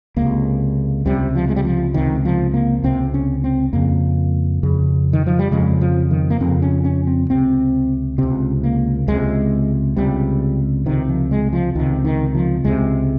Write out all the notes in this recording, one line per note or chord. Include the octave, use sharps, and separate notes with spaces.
C#2 C3 A#3
C#2 C3 G3
F3
G#3
G3
F3
C#2 C3 D#3
F3
A#3
C#2 C3 C4
C#4
C4
F2 C#3 A#3
F2 C#3
D#3
F3
G3
F2 C#3 G#3
F3
D#3
A#3
F2 C#3 C4
C#4
C#4
C4
C#2 C3 C4
C#2 C3 C4
A#3
C#2 C3 G#3
C#2 C3 G3
C#2 C3 D#3
F3
G#3
F3
C#2 C3 D#3
D#3
F3
C#2 C3 G#3